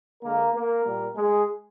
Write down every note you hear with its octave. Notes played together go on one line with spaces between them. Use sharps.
D3 G#3 A#3 A#4
A#3 A#4
A#2 G3 A#3
G#3 G#4